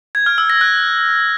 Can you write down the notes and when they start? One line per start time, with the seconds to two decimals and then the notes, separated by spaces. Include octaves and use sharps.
0.15 G#6
0.26 F6
0.38 E6
0.50 A#6
0.61 F#6